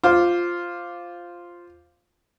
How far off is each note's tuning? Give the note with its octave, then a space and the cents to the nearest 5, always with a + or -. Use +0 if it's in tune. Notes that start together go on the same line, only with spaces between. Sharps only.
F4 +0 C5 +0 D6 +0